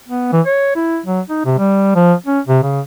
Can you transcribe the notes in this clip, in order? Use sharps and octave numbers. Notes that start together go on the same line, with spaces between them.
B3
E3
C#5
E4
F#3
D#4
C3
G3
F3
C#4
C3
C#3